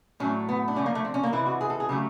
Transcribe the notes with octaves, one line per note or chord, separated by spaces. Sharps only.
A2 F#3 A3 C#4
B3
D4
D3 F3 A3 C#4
A#3
A3
C4
C#4
A#3
C3 E3 G#3 E4
F#4
G#4
A4
G#4
C#3 F#3 A3 G4